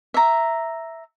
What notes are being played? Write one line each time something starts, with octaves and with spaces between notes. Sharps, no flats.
E5 A#5